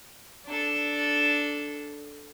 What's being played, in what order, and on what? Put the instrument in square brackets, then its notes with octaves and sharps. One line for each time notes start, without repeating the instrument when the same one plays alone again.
[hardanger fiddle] D4 A4